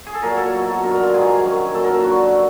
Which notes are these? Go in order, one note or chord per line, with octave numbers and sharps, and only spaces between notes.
G#4
A4
A#2 F#3 A#4
A4
B2 F#3
G2 D3 F#3 A#4
A#4
F4
G#2 D#3 F#3 G#4
F#2 D#3 F#3
A#2 F#3 A4
A#4
A4
G2 D3 F#3 F#4